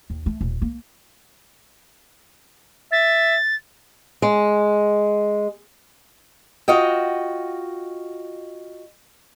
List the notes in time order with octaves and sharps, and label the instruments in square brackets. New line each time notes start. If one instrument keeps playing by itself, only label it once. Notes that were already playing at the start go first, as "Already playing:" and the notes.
[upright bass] D#2
A3
D#1
A#3
[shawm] E5 [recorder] A6
[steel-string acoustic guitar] G#3
F4 F#4 D#5 G5